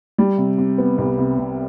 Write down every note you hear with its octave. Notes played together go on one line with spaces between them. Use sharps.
G3
C3
C3
B3
C2
C3
C3